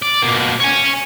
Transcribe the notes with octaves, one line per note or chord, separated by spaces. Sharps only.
D5
B2 A#3
C#5 G#5